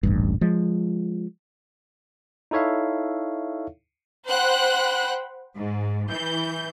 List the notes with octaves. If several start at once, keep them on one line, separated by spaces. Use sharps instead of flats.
D#1 A1 G2
F3 G#3
D#4 E4 A4 C#5 E5 F5
C5 F#5 G5 B5 F#6
G#2
E3 G6